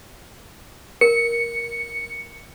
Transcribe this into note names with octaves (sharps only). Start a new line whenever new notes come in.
A#4 C#7